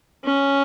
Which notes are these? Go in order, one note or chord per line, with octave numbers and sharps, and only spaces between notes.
C#4